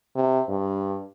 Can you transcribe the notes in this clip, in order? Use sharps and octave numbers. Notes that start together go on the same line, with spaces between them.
C3
G2